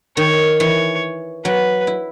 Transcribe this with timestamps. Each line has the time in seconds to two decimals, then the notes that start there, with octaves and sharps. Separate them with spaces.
0.17 D#3 C#5
0.60 E3 C#5
1.45 F#3 B4
1.87 E4